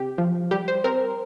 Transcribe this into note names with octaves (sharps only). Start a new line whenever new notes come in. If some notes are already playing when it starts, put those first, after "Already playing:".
Already playing: C3 G4
F3
G3 G4
C5
C4 A#4